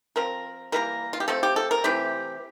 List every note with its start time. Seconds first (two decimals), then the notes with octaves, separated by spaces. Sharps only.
0.16 F3 C4 A#4
0.72 E3 G3 A#3 A#4
1.13 F4
1.20 G4
1.28 F3 A3 C4 A4
1.43 G4
1.56 A4
1.71 A#4
1.84 C3 E3 A3 C4 G4